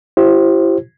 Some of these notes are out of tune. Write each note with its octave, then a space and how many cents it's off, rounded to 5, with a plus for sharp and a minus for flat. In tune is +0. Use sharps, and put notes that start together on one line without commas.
E4 +30 G4 -25 C5 +20